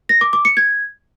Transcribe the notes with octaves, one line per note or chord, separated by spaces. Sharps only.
A#6
D6
D6
C#7
G#6